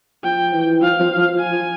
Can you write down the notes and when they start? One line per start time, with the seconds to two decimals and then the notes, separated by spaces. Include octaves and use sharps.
0.24 F3 G5
0.53 E3
0.82 F3 F5
0.99 F3
1.17 F3
1.35 F3
1.39 G#5
1.51 F3